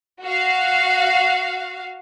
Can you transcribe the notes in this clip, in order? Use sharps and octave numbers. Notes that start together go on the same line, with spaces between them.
F#4 F5